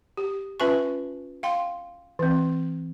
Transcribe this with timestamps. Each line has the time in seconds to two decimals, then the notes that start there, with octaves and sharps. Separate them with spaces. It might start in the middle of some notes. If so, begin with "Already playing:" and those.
0.17 G4
0.60 C#4 F4 B4 E5 G#5 C#6
1.43 F5 G5 C6
2.19 E3 C4